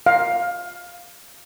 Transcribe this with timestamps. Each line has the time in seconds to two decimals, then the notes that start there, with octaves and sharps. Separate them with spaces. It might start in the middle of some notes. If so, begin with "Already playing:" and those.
0.06 F5